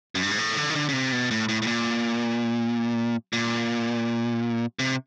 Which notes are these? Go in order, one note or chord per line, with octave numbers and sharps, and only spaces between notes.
F#2
G2
G#2
A2
D3
D#3
D3
C#3
C3
B2
A2
A2
A2
A#2
A#2
C3